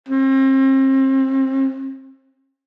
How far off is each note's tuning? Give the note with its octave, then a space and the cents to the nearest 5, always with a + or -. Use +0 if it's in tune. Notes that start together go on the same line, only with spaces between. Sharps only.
C4 +35